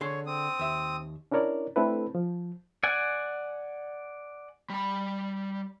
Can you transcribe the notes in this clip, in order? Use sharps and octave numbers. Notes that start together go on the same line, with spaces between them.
D3 G#4 C#5 C6
C4 D#6
D#2 E5
C#4 D4 E4 A#4 C#5 D5
A3 C4 D4 E4 A4 B4
F3
D5 F#5 G#5
G3 B5